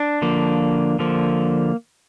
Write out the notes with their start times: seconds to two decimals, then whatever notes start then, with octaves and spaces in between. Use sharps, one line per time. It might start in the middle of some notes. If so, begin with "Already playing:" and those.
Already playing: D4
0.22 D3 F3 A#3
0.99 D3 F3 A#3